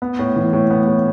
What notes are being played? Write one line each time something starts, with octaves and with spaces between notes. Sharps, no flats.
B3
A2
E3
A2
B3
A2